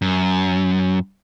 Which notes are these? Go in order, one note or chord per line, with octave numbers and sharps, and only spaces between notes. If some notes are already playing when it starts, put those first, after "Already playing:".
F#2